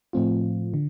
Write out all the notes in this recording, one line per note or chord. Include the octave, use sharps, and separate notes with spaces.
A2 F3 A3 C4 F4
D3